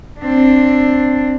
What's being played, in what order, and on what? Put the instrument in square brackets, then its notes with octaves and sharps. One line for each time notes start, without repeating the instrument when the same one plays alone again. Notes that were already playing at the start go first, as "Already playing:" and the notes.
[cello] C4 D4